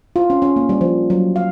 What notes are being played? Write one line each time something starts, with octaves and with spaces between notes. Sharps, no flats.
F4
C#4
C#4
A#3
G3
F3
F#3
F5